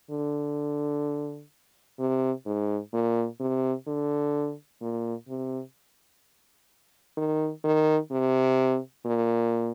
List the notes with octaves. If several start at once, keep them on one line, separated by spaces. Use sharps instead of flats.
D3
C3
G#2
A#2
C3
D3
A#2
C3
D#3
D#3
C3
A#2